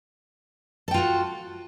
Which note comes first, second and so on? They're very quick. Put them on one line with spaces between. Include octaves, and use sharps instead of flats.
A4 G5 F4 F#4